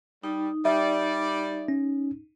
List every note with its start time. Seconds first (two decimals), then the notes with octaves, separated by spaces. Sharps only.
0.24 G3 D#4
0.65 G3 D5 E5
1.68 C#4